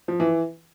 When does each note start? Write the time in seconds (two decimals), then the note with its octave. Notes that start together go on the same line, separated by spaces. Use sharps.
0.08 F3
0.20 E3